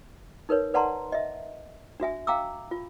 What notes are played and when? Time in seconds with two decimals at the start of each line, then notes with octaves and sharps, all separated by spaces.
0.49 D#4 A#4 B4 C#5
0.74 B4 D5 F#5 A5 A#5 C6
1.12 D#5 E5
2.00 D4 F#4 E5 G#5
2.27 F5 G5 A#5 D6 E6
2.71 F4